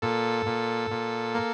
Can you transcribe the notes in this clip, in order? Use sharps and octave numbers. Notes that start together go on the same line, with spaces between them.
A#2 A4
A#2
A#2
A#3